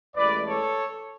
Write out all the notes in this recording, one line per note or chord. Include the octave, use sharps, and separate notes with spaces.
A1 A2 E3 G#3 B4 D5
A4 C#5